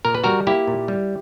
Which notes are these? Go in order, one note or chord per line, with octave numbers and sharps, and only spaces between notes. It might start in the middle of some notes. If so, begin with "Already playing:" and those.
A#2 A#4
B4
G3 F#4 A#4
A#3 E4 G4
A#2
G3